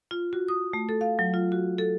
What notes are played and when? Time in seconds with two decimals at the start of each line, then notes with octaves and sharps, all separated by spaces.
0.11 F4
0.33 F#4
0.48 D#6
0.73 A3
0.89 A4
1.01 F5
1.19 F#3
1.34 F4
1.52 F#4
1.79 A4